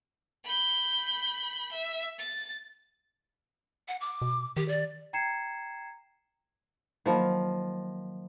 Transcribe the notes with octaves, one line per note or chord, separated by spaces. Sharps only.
B5 G6
E5
A6
F#5
D6
B2
D#3 G4
D5
G5 A#5 G#6 C7 C#7 E7
D#3 F3 F#3 A#3 B5